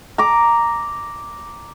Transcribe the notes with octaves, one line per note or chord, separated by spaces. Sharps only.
A#5 D6